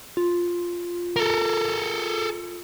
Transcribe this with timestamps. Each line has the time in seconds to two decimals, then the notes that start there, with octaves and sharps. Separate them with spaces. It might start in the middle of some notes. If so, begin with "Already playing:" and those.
0.17 F4
1.16 A4 A#4